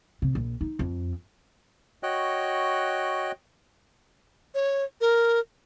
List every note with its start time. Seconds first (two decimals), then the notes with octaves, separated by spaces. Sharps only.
0.22 C3
0.35 A#1
0.61 D#4
0.79 F2
2.03 F#4 C#5 D#5 G5 F#6
4.55 C#5
5.01 A#4